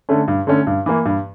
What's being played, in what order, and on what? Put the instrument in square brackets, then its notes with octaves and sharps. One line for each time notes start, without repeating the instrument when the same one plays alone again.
[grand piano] D3 A3 C#4
G2
D3 A3 C#4
G2
E3 A#3
G2